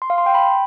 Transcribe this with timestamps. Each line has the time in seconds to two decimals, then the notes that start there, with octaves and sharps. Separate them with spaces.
0.02 C6
0.10 F5
0.18 C6
0.26 G5
0.34 B5